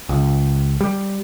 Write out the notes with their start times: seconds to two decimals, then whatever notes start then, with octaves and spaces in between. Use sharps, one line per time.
0.09 C#2
0.81 G3